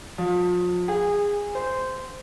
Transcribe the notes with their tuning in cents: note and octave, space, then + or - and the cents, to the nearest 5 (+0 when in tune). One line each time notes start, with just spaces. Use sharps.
F3 +35
G#4 -20
C5 -15